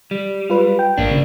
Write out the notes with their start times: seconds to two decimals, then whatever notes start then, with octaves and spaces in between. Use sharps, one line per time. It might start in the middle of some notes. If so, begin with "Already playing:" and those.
0.11 G3
0.50 F4 B4
0.79 G5
0.98 G#1 A#3 D4
1.11 C#3